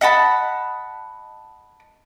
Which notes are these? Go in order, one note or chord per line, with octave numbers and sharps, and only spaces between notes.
D#5 F#5 A5 B5